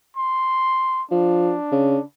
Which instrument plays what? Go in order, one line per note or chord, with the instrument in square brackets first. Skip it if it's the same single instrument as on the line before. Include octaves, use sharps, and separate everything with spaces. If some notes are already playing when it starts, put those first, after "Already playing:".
[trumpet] C6
[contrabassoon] F3 [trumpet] D4
[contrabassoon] C#3